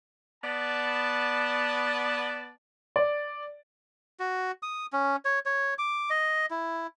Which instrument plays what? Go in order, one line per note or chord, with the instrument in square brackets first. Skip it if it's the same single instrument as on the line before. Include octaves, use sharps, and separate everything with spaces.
[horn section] B3 D5 A5
[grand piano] D5
[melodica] F#4
D#6
C#4
C#5
C#5
D6
D#5
E4